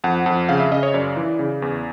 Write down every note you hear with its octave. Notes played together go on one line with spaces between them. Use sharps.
F2 F#5
F2
C#3 F5
E5
C#3 D#5
C#5
F#2 D5
E3
C#3
E2